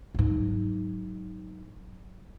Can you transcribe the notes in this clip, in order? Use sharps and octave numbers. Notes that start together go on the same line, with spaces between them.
G#2 F#3